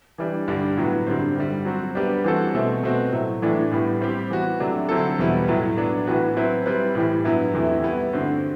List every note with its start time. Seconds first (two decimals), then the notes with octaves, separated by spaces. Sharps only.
0.18 E3 G3 D4
0.48 G2 D3 G3 D4
0.77 A2 F#3 B3 F#4
1.07 G2 D3 G3 C4
1.35 G2 D3 G3
1.65 F#3 C4 F#4
1.95 G3 B3 D4 G4
2.24 E3 G3 C4 F#4 A4
2.54 B2 A3 C4
2.83 B2 A3 C4 F#4
3.12 A2 F#3 A3
3.42 A2 E3 A3 D4
3.72 A2 G3 B3
4.01 G3 C4 G4
4.30 E3 B3 F#4
4.60 C3 F#3 A3 D4
4.89 D3 F#3 C4 E4 A4
5.19 E2 B2 G3 B3 E4
5.48 A2 F#3 A3
5.77 F#3 B3 D4
6.07 A2 E3 B3 F#4 B4
6.36 F#3 C4 E4 B4
6.66 G3 C4 E4 B4
6.95 A2 E3 G3
7.25 G2 F#3 B3 E4
7.54 E2 C3 E3 A3 E4
7.84 G3 B3 E4
8.13 G2 D3 A3 C4 F#4